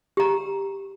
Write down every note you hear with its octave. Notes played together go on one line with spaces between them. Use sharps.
G4 A#5